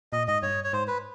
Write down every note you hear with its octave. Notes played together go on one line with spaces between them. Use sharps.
A#2 D#5
G#2 D#5
G2 C#5
C#5
G#2 C5
B4